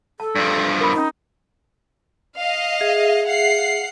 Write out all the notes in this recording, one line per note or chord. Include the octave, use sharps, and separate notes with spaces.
A4 A5
G2 F3
A#4 B5
C#4 D#4 A#5
D#5 F5
G#4 E5
F5 F#5 C7